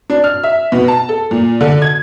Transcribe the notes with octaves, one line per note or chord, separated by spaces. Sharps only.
D4
F6
E5
B2
A5
A4
A#2
D3
G#6